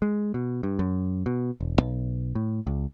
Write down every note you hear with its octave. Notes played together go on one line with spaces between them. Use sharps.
G#3
B2
G2
F#2
B2
E1
B1
A2
C#2